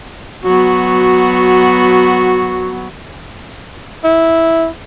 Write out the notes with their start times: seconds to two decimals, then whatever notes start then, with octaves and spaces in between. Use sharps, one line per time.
0.43 F#3 B3 F#4
4.04 E4